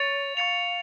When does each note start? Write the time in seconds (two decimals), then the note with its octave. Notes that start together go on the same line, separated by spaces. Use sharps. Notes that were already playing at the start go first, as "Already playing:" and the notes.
Already playing: C#5 C#6 A6 C#7 F7
0.36 F5 C#6 A6 C#7 F7